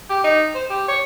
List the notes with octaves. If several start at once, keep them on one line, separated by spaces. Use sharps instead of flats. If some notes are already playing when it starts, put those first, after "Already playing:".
G4
D#4
C5
G4
C#5